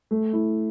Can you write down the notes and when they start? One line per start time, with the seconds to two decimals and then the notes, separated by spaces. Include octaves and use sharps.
0.11 A3
0.33 E4